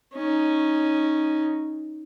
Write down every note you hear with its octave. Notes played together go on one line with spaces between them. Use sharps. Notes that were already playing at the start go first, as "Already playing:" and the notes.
C#4 D#4